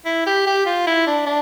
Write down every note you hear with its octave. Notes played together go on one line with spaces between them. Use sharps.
E4
G4
G4
F4
E4
D4
D4